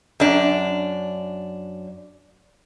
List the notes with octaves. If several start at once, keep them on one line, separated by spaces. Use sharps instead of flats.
F#2 D4